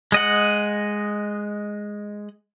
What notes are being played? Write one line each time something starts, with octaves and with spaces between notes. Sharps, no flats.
G#3 D#5 F#5